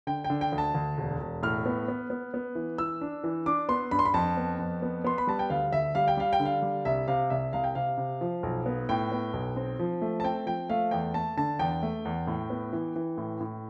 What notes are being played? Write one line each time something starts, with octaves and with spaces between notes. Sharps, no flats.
D3 G5
G5
D3
G5
D2
A5
D2
E1
E1
A2 F6
B3
B3
B3
B3
E3
E3 E6
D4
E3
D4 D6
B3 C6
G2 B5
C6
B5
F2 A5
B3
F2
B3
B3 C6
B5
G3 A5
G5
D2 F5
D2 E5
G3 F5
G5
G3 F5
G5
D3
F5
G3
C2 E5
C3 F5
C2 E5
C2 F5
G5
C3 F5
C3
F3
B1
B3
A2 G5
B3
B1
C4
F3
A3
A5
C4 G5
F3 G5
A3 F5
E2 G5
A3 A5
D3 A5
E2 G5
A3
E2
A2
B3
E3
E3
A2
A2